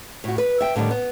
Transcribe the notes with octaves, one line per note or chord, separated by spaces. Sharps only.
A2 F#4
B4
E5 G5
A2 D3 D#3 G3
B3